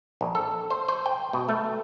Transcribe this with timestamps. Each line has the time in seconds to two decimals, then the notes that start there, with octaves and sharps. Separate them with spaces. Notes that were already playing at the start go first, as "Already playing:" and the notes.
0.21 A#1
0.35 A4
0.70 C5
0.88 C5
1.06 G5
1.33 B2
1.49 A3